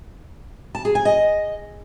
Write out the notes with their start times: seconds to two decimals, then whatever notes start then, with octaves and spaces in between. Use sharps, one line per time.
0.75 A5
0.85 G#4
0.95 G#5
1.05 D#5